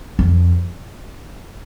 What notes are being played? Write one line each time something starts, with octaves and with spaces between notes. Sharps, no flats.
F2